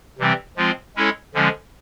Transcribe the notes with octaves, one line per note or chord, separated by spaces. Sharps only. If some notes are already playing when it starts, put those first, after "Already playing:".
C3 E3 G3 C4
F3 G#3 C4 F4
G#3 C#4 E4 A4 C#5
D3 F3 G#3 C#4